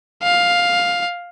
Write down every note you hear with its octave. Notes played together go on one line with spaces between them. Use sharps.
F5